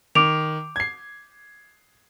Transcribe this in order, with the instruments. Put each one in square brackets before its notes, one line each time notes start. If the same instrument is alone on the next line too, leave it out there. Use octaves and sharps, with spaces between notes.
[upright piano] D#3 [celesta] D6 D7 F7
[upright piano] G#6 C7